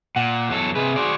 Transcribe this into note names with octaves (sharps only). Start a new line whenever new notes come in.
A#2 F#5
E2 F#3 A4
C3 G#4 B4
F#4 C5 D5